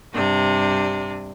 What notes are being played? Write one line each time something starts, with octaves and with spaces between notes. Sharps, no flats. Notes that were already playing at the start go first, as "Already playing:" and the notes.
G2 C3 D4